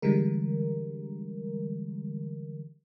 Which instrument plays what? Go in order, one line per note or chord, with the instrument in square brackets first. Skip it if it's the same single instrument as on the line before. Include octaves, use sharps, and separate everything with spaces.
[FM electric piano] D3 E3 G3 G#3 A#4